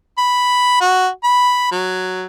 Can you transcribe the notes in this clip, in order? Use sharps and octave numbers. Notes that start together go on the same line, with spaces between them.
B5
F#4
B5
F#3